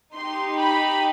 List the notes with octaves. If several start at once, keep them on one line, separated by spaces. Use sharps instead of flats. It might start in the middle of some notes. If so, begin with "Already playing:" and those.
D#4 G4 C6
B5